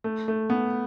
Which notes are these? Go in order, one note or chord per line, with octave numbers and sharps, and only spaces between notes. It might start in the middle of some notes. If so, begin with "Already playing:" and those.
A3
A3
B3